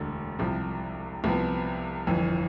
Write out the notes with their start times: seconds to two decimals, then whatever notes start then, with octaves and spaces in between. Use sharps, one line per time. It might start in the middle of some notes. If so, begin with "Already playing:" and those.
Already playing: E1 D2 D3
0.39 C2 C3 F3
1.24 C2 C3 F3 B3
2.07 G1 F2 E3